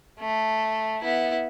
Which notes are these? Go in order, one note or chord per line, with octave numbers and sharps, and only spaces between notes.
A3
B3 E4